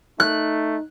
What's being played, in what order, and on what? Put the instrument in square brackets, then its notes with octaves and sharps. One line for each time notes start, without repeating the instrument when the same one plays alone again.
[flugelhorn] A3 [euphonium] D#4 [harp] F#6